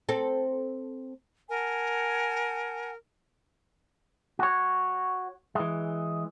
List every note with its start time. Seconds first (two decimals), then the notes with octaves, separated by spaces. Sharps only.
0.09 C4 A4
1.49 A#4 F#5 G#5 A5
4.39 F#4 C#5
5.55 E3 G#3